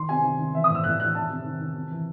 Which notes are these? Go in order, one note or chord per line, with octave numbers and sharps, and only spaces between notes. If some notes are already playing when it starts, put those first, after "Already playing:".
Already playing: D#3 C6
C3 G#5
D#3
D#3
E3 E5
D#6
A2
E6
A2 F#6
E3 F#6
D#3 A5
C3
D#3
D#3
C3
E3